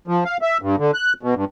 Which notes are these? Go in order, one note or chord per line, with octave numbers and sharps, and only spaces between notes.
F3
F5
E5
G2
D3
F#6
B2
G2